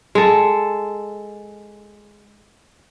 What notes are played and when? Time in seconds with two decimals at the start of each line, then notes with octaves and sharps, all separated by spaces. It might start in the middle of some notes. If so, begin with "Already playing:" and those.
0.15 G#3 A4